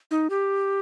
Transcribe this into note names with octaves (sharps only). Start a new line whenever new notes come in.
D#4
G4